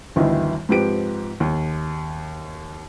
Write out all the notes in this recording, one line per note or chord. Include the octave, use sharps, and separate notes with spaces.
G1 D2 D#3 E3 E4 D#5
G#2 F3 C4 G4 B4 D7
D#2